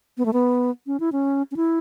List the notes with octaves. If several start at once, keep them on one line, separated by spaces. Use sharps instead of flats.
B3
A3
B3
C#4
E4
C#4
C#4
E4